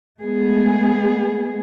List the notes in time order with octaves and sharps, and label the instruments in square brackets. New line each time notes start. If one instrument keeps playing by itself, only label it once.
[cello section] G#3 A3 B3 G#4